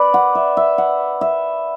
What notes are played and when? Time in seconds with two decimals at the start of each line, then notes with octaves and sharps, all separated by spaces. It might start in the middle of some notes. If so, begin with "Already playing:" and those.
Already playing: B4 D5
0.14 F#5
0.35 E5
0.57 E5
0.78 F#5
1.21 E5